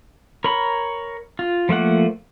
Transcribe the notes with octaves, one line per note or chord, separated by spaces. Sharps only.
A#4 C#5 B5
F4
F3 A3 A#3 F#5